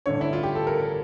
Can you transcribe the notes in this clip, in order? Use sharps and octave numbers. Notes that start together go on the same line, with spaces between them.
A1 G2 D3 C#5
E4
F4
G4
A4
A#4
A#4